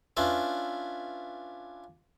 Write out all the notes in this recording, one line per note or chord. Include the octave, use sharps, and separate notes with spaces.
C#4 D4 F4 B4 E5